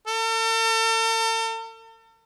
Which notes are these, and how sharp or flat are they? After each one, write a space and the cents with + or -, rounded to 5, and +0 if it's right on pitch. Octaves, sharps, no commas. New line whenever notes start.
A4 +45